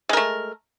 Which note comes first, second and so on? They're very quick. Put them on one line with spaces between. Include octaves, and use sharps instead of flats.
G#3 A#4 A3